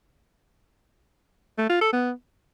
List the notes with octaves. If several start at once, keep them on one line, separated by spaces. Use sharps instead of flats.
A3
F4
A4
B3